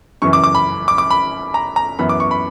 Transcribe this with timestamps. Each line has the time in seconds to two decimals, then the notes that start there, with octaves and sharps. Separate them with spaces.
0.22 F#2 C#3 E3 C#6
0.33 D6
0.44 D6
0.55 B5
0.88 D6
0.98 D6
1.10 B5
1.54 A#5
1.76 A#5
1.99 F#2 E3 B3 B5
2.09 D6
2.20 C#6
2.31 B5